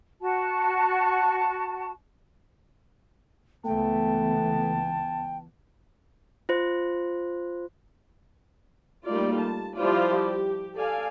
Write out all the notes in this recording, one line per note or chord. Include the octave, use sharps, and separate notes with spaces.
F#4 A5
C#2 E3 A3 B3 G5 A5
F4 C5
G3 A3 A#3 D#4 F4 D5
A5
F3 G3 E4 F4 C5 D5
G4
A4 D5 F5 G#5